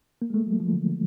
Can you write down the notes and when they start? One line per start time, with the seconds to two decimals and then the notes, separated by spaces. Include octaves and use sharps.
0.22 A#3
0.30 G#3
0.34 A3
0.46 F#3
0.60 F3
0.73 D3